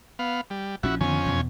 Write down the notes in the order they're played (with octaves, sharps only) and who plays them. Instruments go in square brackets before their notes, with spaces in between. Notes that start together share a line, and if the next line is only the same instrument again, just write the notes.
[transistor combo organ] B3 F5
G3
[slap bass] A#1 F3 C#4 [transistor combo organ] E4 F#4
[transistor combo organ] F2 C#4 G#5 [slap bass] D3 D#3 B3
[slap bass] E2 B2